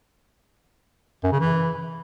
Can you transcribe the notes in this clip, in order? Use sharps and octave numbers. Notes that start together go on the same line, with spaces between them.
F#2
C#3
E3